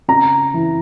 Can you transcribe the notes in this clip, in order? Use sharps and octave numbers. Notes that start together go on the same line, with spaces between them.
C#3 A#5
E3